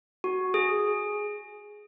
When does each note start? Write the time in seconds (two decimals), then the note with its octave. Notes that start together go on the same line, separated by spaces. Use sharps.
0.24 F#4
0.54 G#4